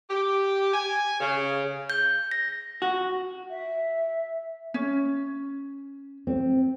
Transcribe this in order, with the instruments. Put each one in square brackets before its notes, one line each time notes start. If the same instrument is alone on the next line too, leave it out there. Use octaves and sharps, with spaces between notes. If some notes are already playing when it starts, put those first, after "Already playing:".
[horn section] G4
G#5
C#3
[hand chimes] G6
A#6
[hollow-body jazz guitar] F#4
[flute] E5
[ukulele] C#4
[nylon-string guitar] C4